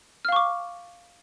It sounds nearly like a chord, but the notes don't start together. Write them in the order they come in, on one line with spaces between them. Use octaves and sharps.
F6 F5 C#6 D6